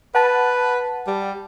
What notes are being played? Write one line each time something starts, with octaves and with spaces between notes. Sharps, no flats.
B4 F#5 A5
G3